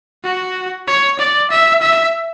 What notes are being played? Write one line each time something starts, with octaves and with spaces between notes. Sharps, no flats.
F#4
C#5
D5
E5
E5